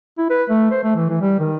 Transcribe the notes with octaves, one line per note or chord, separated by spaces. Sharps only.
E4
B4
A3
C5
A3
E3
E3
G3
D#3